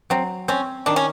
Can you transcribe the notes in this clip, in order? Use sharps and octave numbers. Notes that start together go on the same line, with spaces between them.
F#3 C4
C4 C#4
D#3 D4
C#4